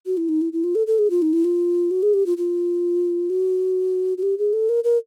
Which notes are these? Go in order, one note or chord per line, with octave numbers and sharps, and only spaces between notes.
F#4
E4
D#4
E4
E4
F4
A4
A4
G#4
F4
D#4
E4
F4
F#4
G#4
G4
F4
F4
F#4
F#4
G4
G#4
A4
A#4
A#4